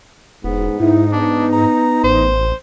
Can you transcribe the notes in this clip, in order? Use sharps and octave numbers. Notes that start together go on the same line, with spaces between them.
E1 G#2 B3
G#2 D#4 E4
B3 D4
A#5
A1 C5